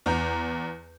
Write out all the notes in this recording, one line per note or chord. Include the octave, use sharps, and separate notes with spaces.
E2 A#5 G6